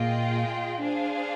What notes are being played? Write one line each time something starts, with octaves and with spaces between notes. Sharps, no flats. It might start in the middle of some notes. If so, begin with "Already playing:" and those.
Already playing: A#2 F4 G#4 D#5 G5
D4 G#4 C5 F5